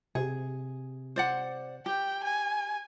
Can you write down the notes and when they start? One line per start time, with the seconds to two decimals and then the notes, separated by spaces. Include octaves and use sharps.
0.15 C3 G#4
1.16 C5 D5 F#5
1.86 G4 G5
2.24 G#5